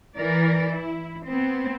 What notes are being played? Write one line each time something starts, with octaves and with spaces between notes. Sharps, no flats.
E3 A#4 D5
E4
B3 C4